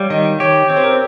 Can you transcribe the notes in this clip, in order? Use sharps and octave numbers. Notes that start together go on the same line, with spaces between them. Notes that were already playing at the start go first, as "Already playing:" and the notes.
Already playing: G3 C#5 F5
D#3 D#5
G4 C#5
C4 C#5
C5
A#4
C5